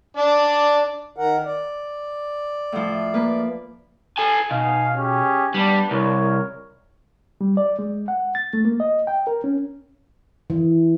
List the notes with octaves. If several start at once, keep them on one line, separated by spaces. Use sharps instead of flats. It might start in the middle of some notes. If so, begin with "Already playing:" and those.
D4 D5
D#3 A#4 F#5
D5
A2 F3
A#3 B4
A4 G#5
B2 D#4 F5 G#5
C#4 G4 G#4
G3 B3 D4
C2 A#4 C#5
G3
D5
G#3
F#5
A6
A3
A#3
D#5
G5
A#4
C#4
E3